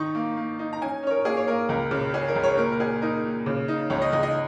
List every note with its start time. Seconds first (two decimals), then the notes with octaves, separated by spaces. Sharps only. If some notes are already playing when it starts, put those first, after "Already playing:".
Already playing: D#3 D#4 C#6
0.15 A#3
0.37 A#3
0.59 D#4
0.73 A#5
0.81 C#4 G#5
1.03 C#4 C#5
1.10 A#4
1.25 A#3 G#4
1.37 C#5
1.47 A#3 A#4
1.69 C#2 A#4
1.91 C#3
2.14 C#4 G#4
2.28 A#4
2.35 C#2
2.43 C#5
2.57 A#2 A#4
2.72 A#4
2.80 A#2 G#4
3.02 D#4 A#4
3.24 A#2
3.46 C#3
3.68 D#4
3.90 C#2 C#5
4.02 D#5
4.12 C#2 D#5
4.23 D#5